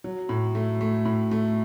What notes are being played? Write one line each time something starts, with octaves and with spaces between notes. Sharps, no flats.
F#3
A2
A3
A3
A2
A3